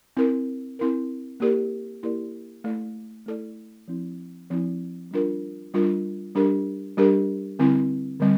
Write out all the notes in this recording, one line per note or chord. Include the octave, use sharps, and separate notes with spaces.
C4 E4 A#4
C4 E4 A#4
A#3 E4 G4 A#4 D5
A#3 E4 G4 A#4 D5
A3 E4 A4 D5
A3 E4 A4 D5
F3 C4 E4
F3 C4 E4
G3 D4 F4 A#4
G3 D4 F4 A#4
G3 D4 G4 A#4
G3 D4 G4 A#4
D3 G3 C4 E4
D3 G3 C4